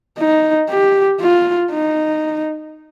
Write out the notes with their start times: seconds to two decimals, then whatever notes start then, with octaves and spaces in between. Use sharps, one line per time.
0.19 D#4
0.69 G4
1.20 F4
1.71 D#4